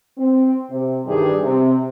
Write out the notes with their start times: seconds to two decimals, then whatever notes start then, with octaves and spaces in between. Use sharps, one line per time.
0.18 C4
0.70 C3
1.05 G2 D#3 E3 G3 G4 G#4
1.42 C3